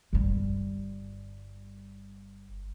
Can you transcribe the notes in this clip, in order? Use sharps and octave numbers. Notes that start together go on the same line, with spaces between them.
G1 G3